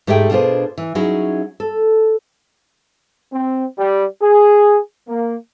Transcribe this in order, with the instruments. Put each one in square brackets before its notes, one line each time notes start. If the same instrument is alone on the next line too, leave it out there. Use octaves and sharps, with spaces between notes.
[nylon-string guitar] G#2 A3 G4 G#4 E5 G5
B2 D4 F4 G#4 C5
E3
F#3 C#4 D#4 E4 G#4
A4
[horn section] C4
G3
G#4
A#3